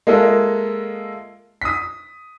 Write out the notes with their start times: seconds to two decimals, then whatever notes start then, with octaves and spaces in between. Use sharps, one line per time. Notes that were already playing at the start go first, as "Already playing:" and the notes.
0.07 G#3 A#3 F4 A4 D#5 E5
1.62 D#6 B6